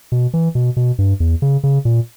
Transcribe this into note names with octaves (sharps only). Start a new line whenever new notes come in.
B2
E3
B2
B2
G2
E2
C#3
C#3
A#2